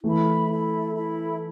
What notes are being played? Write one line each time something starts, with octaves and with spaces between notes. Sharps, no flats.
E3 A3 E4 A4 E5 B5
E4 A4 E5 B5
E4 A4 E5 B5